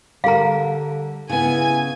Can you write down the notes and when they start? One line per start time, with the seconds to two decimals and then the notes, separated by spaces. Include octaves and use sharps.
0.24 D3 G3 A#4 F5 A#5
1.29 C#3 B3 E4 G#5